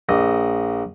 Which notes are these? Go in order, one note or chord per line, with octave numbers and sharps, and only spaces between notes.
A#1 D#5